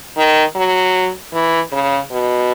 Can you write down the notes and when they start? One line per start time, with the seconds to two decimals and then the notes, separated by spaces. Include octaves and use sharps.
0.17 D#3
0.55 F#3
1.33 E3
1.72 C#3
2.11 B2